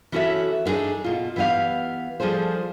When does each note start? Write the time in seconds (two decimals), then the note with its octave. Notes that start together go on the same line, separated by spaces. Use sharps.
0.12 E3 C#4 F#4 A4 C#5 E5
0.65 B3 D4 D#4 G#4 A4
1.04 B2 F4
1.36 E3 B3 G4 D#5 F5
2.20 F3 G3 G#4 A4 C5